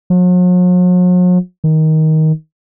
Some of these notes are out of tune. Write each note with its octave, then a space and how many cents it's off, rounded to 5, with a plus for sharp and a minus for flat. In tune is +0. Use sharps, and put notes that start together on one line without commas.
F#3 -45
D#3 +15